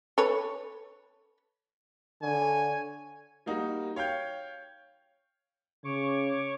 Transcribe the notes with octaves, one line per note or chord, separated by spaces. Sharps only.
A4 B4 C#5
D3 C#5 G#5
G3 A#3 D#4 F#4
C#5 F5 G5 G6
C#3 C#5 C#6 D6